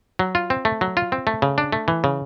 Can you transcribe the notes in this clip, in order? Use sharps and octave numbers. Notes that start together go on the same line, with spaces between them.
F#3
F4
C4
A3
F#3
F4
C4
A3
C#3
D4
A3
E3
C#3